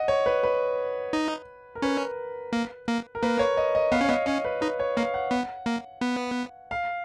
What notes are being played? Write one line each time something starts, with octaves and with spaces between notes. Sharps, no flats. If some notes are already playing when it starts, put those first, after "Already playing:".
Already playing: D#5 F#5
C#5
B4
B4
D#4
A#4
C#4 B4
A#3
A#3
A#4
A#3 B4
C#5
D#5
D#5
B3 F5
C#4 C#5
B3 D#5
C#4 D#5
B4
D#4 B4
C#5
A#3 F5
F#5
B3
A#3
B3
F5